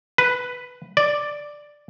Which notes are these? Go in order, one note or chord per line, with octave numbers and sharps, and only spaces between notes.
B4
D5